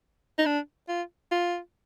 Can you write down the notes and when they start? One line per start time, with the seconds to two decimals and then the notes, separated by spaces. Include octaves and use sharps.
0.38 D#4
0.46 D4
0.89 F4
1.31 F4